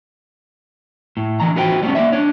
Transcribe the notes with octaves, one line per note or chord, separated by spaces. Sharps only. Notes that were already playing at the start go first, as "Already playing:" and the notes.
A2
D3 E3 A#5
F4 F#4 B4 C5 G5
G3 A3 B3 C#4
A#3 D5 E5
D4 C#5